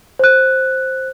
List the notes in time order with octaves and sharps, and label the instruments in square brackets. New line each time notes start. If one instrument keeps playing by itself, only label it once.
[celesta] C5 F#6